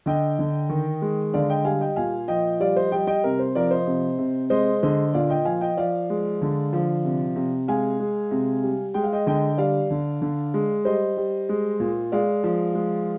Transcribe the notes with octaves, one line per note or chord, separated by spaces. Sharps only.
D3 D#5 G5
D3
D#3
G#3
D3 D5 F5
D#5 G5
G3 F5 G#5
D#5 G5
A#2 F5 G#5
F3 D#5 G5
G3 D5 F5
C5 D#5
G3 D#5 G5
D#5 G5
C3 A#4
C5
F3 A#4 D5
C5 D#5
C3
C3
G#3 C5 D#5
D3 C5 D#5
A#2 D5 F5
D#5 G5
F3 F5 G#5
D#5 G5
F3 D5 F5
G#3
D3
F3
C3
C3
G#3 F5 G#5
G#3
C3
G3
G#3 G5
F5
D#5 G5
D3 D#5 G5
G3 D5 F5
D3
D3
G#3
G3 C5 D#5
G3
G#3
A#2
G#3 D5 F5
F3
G#3